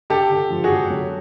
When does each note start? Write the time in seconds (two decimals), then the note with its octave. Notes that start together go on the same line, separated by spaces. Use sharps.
0.10 D3 G4 A4
0.30 D3
0.50 F3
0.64 F#4 G#4
0.70 D3
0.90 F#3